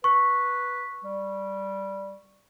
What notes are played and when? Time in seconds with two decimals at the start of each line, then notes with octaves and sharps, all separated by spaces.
0.04 B4 C#6
1.04 G3